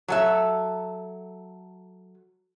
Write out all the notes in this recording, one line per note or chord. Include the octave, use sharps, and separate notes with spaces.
F#3 A4 E5